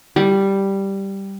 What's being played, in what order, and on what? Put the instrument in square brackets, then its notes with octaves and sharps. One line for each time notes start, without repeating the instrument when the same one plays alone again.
[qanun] G3